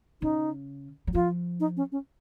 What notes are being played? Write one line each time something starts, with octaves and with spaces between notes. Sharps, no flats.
C#3 D#4
F#3
F3 F4
D#4
C#4
C#4